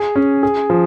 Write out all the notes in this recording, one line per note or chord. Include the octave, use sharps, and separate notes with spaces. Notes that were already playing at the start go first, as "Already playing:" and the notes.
Already playing: G#4
C#4
G#4
F3